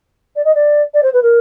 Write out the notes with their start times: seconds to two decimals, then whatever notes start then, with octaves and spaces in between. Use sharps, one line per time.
0.35 D5
0.44 D#5
0.54 D5
0.93 D5
1.02 C5
1.13 B4
1.22 A#4